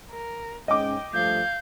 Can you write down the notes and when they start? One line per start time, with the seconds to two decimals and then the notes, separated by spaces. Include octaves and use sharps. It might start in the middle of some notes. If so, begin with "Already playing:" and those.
0.11 A#4
0.68 G#2 G#3 C#4 D#5 G5 D6
1.14 G2 F3 A3 F5 G6